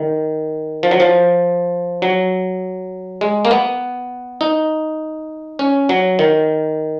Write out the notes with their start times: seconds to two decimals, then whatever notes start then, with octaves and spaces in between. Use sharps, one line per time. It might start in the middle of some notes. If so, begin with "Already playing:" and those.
Already playing: D#3
0.83 F3
0.91 F#3
1.00 F3
2.02 F#3
3.21 G#3
3.45 A#3
3.51 B3
4.41 D#4
5.59 C#4
5.89 F#3
6.19 D#3